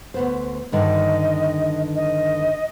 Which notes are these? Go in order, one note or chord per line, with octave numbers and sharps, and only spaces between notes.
D2 B3 C5
G2 D3 D#3 D#5
D#5